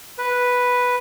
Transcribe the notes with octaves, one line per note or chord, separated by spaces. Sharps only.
B4